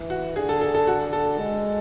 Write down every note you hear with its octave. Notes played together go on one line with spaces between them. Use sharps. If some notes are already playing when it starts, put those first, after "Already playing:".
Already playing: E3
F#4
D3 G#4
A4
A4
A4
F#4
A4
G#3